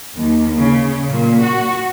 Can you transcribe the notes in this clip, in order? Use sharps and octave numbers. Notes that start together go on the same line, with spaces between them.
D#2
C#3
A#2
F#4